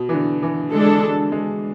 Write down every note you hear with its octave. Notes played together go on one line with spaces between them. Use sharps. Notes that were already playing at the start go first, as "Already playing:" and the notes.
Already playing: B2
E3
D3
E3
D3 G#3 D4 A4
G#3